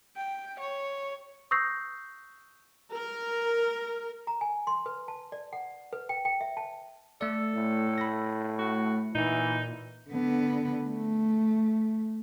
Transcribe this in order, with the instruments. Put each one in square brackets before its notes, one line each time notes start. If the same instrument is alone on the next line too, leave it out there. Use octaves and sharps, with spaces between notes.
[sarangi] G5
C#5
[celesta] C#6 D#6 E6 G6 A#6 C7
[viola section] A#4
[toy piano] A#5
G#5
C6
B4
A5
D5
F#5
B4
G5
G5
E5
A5
[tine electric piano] A3 D5 [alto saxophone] A4
[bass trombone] A2
[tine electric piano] B5 A#6
[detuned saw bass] A3 [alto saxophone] F#4
[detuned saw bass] A#2 [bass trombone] E3 [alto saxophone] D#4
[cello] D3 B3
A3